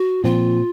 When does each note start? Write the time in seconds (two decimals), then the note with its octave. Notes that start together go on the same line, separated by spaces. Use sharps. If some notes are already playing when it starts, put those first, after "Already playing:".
Already playing: F#4
0.24 A#2 F3 C4 F4